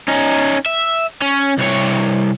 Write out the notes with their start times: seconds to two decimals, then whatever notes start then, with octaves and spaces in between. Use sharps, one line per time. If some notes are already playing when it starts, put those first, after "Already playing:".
0.08 C#4 D#4
0.66 E5
1.22 C#4
1.58 C2 C#5